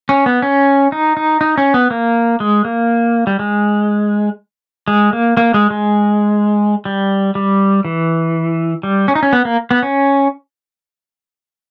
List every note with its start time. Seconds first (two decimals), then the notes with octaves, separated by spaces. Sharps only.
0.09 C#4
0.26 B3
0.42 C#4
0.92 D#4
1.17 D#4
1.41 D#4
1.58 C#4
1.74 B3
1.91 A#3
2.40 G#3
2.65 A#3
3.27 G3
3.39 G#3
4.88 G#3
5.13 A#3
5.37 A#3
5.54 G#3
5.71 G#3
6.85 G3
7.35 G3
7.85 E3
8.83 G3
9.08 C#4
9.15 D#4
9.23 C#4
9.33 B3
9.45 A#3
9.71 B3
9.83 C#4